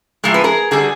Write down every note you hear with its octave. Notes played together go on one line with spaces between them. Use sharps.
A2 F3 G#3 A#4
B4
G#4 A#4
D3 G3 F#4 G#4